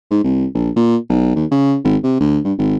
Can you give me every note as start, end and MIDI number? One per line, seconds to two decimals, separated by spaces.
0.11 0.22 44
0.24 0.46 36
0.55 0.70 34
0.76 0.97 46
1.10 1.31 35
1.36 1.45 39
1.51 1.77 49
1.84 1.97 32
2.03 2.16 48
2.20 2.39 38
2.44 2.53 43
2.58 2.77 32